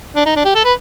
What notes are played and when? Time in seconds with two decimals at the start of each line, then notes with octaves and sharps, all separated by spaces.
0.16 D4
0.26 D#4
0.36 D4
0.45 G4
0.55 A4
0.65 B4